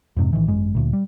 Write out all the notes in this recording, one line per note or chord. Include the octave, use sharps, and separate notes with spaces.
F2 G#2 C3
A1 D#3 E3
G#1 F#2 G#3
D1 D2 A#2
G3